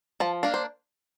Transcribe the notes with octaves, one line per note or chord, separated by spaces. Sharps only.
F3 A5
A#3 D4 F5
C5